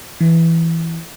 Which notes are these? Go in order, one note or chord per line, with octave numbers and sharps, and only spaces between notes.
E3